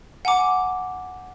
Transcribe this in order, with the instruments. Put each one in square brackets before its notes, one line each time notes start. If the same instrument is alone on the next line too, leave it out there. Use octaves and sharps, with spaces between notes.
[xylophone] F#5 G#5 A#5 D6